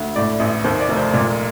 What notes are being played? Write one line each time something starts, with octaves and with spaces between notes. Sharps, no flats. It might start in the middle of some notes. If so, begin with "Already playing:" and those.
Already playing: D2
A2 D5
A1
D#2 C5
D5
F1
C5
A#2 D5